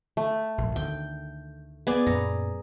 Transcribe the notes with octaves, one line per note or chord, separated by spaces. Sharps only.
A3
A#1 G#2
D2 D3 D#3 G5
B3 G#4 D5
F#2 A#2 A#5